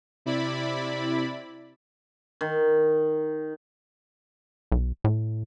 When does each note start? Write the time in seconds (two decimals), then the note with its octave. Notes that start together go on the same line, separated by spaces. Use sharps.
0.26 C3 E4 D5 B5
2.41 D#3
4.72 B1
5.04 A2